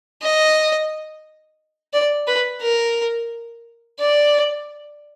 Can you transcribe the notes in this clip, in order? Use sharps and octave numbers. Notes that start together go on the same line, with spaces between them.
D#5
D5
B4
A#4
D5